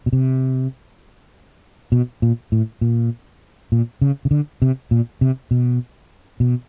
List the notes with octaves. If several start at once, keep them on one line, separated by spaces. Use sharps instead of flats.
B2
C3
B2
A#2
A2
A#2
A#2
C#3
C#3
D3
C3
A#2
C3
B2
B2